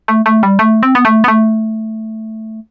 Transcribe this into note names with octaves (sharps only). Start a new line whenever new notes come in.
A3
A3
G3
A3
C4
B3
A3
B3
A3